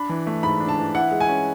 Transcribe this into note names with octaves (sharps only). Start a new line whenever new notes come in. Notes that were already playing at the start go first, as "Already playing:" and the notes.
Already playing: D4 B5
E3
A3
G#2 B5
D4
A5
E3
E4 F#5
G#3
G#5
C#4